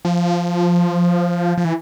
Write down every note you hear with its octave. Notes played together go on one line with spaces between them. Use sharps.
F3
F3
E3